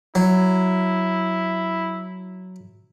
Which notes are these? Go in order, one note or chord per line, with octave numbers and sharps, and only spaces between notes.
F#3 E4